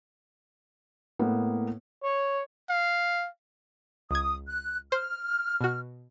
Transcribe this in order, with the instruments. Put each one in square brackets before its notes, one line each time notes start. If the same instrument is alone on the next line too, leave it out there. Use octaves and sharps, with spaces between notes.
[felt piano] A2 A#3 B3
[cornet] C#5
[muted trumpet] F5
[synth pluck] C#2 G#6 [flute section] D#6
[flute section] F#6
[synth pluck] C5 [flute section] F6
[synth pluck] B2 F#4